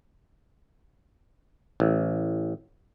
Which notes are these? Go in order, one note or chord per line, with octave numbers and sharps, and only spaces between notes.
A1